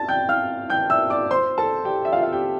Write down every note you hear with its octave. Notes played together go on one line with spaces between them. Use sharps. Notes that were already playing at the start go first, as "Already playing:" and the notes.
Already playing: A5 A6
G5 G6
F5 F6
G5 G6
E5 E6
D5 D6
C5 C6
A4 A5
G4 G5
E5
F4 F5
F5
G4 G5